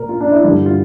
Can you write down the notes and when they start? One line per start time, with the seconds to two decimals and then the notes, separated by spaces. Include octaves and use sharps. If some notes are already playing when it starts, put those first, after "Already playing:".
Already playing: A#2 A#4
0.09 F4
0.21 D4
0.32 E4
0.43 G2 D3 G3 E4
0.66 F4